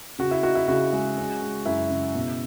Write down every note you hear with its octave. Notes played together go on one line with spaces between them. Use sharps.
C#3 F#4
E4
D#4 F#4
E4
C#3 F#4
G#3
C#4
G#3
F#2 E4
C#3
B2